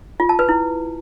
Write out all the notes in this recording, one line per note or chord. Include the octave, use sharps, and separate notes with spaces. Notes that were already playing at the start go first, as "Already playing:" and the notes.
F4
A5
B4
E4